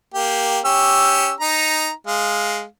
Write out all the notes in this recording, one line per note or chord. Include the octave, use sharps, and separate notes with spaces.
A#3 G4
C#4 G4 E6
D#4 A#5
G#3 F5